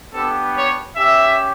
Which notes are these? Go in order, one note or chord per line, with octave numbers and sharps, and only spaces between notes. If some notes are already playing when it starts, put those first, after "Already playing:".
B3 D4 G4 A4
C#5
C#4 G4 E5